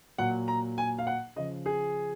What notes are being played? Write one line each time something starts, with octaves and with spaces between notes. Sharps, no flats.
A#2 F#3 F#5
A#5
G#5
F5
F#5
C#3 F3 D#5
G#4